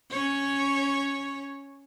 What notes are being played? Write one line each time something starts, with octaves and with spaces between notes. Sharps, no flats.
C#4 C#5